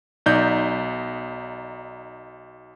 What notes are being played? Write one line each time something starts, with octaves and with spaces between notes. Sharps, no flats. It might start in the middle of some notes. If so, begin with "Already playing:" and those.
B1 D#4 D5 G6